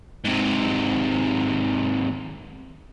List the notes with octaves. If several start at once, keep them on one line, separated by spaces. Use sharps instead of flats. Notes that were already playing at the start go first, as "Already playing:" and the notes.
G#2 C3